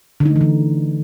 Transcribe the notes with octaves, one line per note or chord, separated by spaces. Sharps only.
D3
D#4
A3
E3
D3